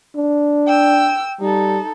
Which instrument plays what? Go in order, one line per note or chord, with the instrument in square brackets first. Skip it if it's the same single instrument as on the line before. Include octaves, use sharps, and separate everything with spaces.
[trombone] D4
[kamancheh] G5 E6
[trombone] G3 [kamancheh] D#4 A4